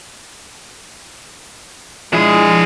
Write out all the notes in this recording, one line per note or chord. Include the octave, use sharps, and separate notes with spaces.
F3 G#3 D4 E4 G#4